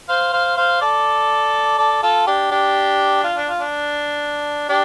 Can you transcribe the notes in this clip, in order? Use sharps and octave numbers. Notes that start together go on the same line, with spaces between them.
C5 F5
C5 F5
C5 F5
A4 D5
A4 D5
F4 A4
D4 G4
D4 G4
F4
D4
F4
D4
D4 G4